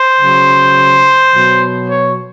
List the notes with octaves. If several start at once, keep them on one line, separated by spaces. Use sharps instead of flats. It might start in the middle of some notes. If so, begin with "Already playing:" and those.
Already playing: C5
C#3 F#3
B2 F#3
C#5